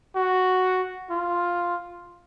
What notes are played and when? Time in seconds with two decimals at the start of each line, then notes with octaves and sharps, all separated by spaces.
0.16 F#4
1.11 F4